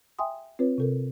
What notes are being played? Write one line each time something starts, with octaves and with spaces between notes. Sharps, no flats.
E5 G5 G#5 C6 D#6
C4 F4 B4 C#5
C3 A4 A#4